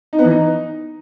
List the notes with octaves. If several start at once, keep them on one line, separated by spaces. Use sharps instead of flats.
D#4
B3
E3
D#4